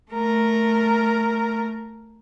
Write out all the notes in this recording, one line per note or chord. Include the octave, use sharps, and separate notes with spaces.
A3 A#4